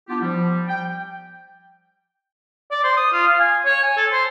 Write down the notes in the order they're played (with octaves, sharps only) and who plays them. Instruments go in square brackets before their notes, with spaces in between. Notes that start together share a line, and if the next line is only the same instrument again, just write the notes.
[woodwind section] B3 D4 E4 F4 G4
F3 G3
G5
[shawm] D5
C5
D#6
F4
F5
G#5
C#5
G#5
A4
C5